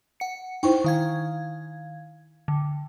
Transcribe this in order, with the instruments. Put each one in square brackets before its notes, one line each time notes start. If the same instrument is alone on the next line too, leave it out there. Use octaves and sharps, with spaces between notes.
[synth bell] F#5 C#7
[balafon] D#4 E4 C5 [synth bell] G5 C#6
[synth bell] D#3 F5 G#6
D3